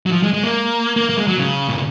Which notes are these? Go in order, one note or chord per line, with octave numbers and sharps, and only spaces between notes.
F#3
F3
G#3
G#3
A#3
A#3
A#3
G#3
F#3
C#3
A#2